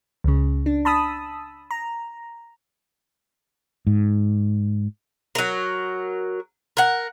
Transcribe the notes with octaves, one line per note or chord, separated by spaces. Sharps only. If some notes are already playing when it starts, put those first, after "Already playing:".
C#2 C#3
D4
A5 B5 D#6 E6
A#5
G#2
F#3 A#4
A#4 F#5